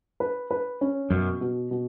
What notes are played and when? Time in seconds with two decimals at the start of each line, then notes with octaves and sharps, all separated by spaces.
0.20 B4
0.51 B4
0.81 C#4
1.10 F#2 B2
1.41 B2
1.71 B2